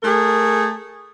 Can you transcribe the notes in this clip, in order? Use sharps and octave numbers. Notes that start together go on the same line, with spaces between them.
A3 G#4 A#4